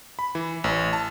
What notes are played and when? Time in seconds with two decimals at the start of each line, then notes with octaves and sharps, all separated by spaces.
0.19 B5
0.35 E3
0.64 A1
0.93 A5